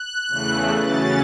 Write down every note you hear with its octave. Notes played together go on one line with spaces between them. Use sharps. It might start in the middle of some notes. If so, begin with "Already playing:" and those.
Already playing: F#6
E2 C#3 E3 A3
C#3 F#3 C#4 A6